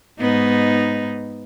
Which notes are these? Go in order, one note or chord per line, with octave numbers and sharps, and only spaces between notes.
G#2 B3 D#4